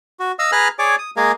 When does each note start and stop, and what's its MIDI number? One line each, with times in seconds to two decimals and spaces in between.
0.20 0.32 66
0.39 0.51 75
0.39 0.51 77
0.39 0.51 88
0.52 0.68 68
0.52 0.68 71
0.52 0.68 82
0.52 0.68 89
0.52 0.68 90
0.79 0.96 68
0.79 0.96 73
0.79 0.96 74
0.79 0.96 86
0.98 1.11 87
1.16 1.32 56
1.16 1.32 58
1.16 1.32 68
1.16 1.32 70
1.16 1.32 77